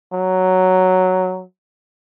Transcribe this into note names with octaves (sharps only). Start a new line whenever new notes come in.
F#3